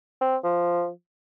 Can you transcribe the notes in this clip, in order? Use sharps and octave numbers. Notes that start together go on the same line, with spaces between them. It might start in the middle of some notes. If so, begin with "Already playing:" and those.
C4
F3